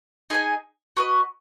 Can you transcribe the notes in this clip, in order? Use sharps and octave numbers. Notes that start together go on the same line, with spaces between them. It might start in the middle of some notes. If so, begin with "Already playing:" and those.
D#4 G#4 D#5 G#5
F#4 B4 D#5